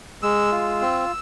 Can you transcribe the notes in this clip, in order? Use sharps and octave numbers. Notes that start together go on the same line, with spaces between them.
G#3 E6
F4
C4